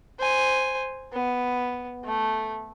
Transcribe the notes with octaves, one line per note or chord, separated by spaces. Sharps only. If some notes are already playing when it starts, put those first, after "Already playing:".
C5 G#5
B3
A3